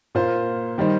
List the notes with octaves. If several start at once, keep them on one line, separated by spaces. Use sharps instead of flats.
A#2 A#3 F4 C5
D#3 G3 D#4 C5